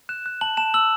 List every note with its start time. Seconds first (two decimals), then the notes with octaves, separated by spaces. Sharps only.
0.09 F#6 E7
0.26 F#6
0.41 A5 F#7
0.57 A5 E7
0.74 E6 F#7